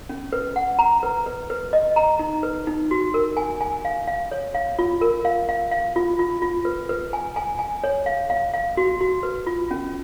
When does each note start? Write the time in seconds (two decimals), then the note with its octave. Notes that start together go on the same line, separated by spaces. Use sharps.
0.09 C#4
0.33 B4
0.56 F#5
0.79 A#5
1.03 B4
1.26 B4
1.50 B4
1.73 D#5
1.96 A#5
2.19 D#4
2.43 B4
2.67 D#4
2.91 F#4
3.14 A#4
3.37 G#5
3.61 G#5
3.85 F5
4.08 F5
4.31 C#5
4.55 F5
4.79 F4
5.01 A#4
5.25 F5
5.49 F5
5.71 F5
5.96 F4
6.19 F4
6.42 F4
6.65 B4
6.89 B4
7.13 G#5
7.36 G#5
7.59 G#5
7.84 C#5
8.06 F5
8.30 F5
8.53 F5
8.77 F#4
9.01 F#4
9.23 B4
9.47 F4
9.71 C#4